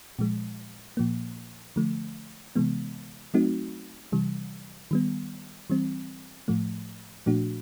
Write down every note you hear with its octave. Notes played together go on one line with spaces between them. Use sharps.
A#2 F3 G#3
A#2 F3 A#3
D3 F3 A3
C3 E3 G#3 B3
F#3 A3 C4 D#4 F#4
C3 E3 G3
D#3 G3 B3
E3 G3 C4
A2 F3 A3
A#2 F3 A3 D4 F#4